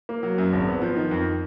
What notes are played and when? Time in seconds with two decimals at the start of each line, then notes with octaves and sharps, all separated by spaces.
0.09 A#3
0.23 F#3
0.38 F#2
0.53 G#1
0.68 B3
0.82 F3
0.96 D#3
1.11 F2